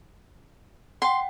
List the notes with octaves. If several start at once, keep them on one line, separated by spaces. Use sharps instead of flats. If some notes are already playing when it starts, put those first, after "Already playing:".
F#5 G5 C6